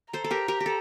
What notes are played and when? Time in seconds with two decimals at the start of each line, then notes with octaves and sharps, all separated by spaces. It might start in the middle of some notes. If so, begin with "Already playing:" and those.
0.13 A4 C5 A#5
0.24 A4
0.31 G4 A#4
0.48 G4 A#4
0.60 G4
0.66 A4